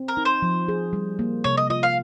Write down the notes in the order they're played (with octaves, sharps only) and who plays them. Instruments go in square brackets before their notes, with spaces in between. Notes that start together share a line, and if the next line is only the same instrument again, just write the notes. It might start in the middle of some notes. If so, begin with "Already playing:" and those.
Already playing: [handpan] C4
[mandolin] A#4
[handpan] D#4
[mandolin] C5
[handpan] F3
G#4
G3
A#3
[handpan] C3 [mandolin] C#5
[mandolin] D#5
[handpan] F4 [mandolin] D#5
[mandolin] F5